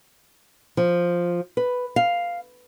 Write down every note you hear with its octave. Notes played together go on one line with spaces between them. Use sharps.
F3
B4
F5